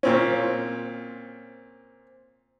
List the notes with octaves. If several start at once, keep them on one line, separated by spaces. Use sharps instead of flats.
A#2 C4 C#4